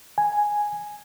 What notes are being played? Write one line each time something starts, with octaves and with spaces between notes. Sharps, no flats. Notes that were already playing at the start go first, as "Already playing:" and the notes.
G#5